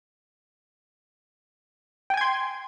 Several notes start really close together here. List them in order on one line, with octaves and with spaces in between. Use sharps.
G5 G#5 G#6 C6